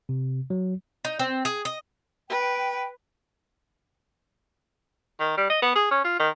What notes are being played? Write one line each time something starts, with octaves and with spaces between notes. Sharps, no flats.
C3
F#3
D#4
C4
G#4
D#5
B4 G5
D#3
G3
D#5
B3
G#4
C#4
F4
D#3